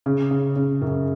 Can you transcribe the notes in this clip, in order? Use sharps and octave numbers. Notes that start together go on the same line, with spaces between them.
C#3
C#3
C#3
F#2